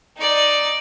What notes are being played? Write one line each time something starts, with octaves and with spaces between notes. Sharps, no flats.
D#4 D5